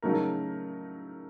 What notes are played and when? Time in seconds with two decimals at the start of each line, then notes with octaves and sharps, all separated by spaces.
0.02 C#3 F#3 A3 D#4 A#4